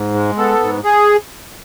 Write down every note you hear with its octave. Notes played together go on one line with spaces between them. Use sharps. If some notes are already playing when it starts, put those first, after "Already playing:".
Already playing: G#2
G#3
B3 A4
G#2
G#4